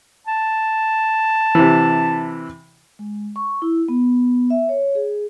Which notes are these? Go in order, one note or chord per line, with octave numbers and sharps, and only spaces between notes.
A5
C3 E3
G#3
C#6
E4
B3
E5
C#5
G#4